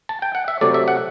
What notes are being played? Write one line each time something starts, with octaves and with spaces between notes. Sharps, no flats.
A5
G5
F#5
E5
C3 F#3 A3 D5
E5
F#5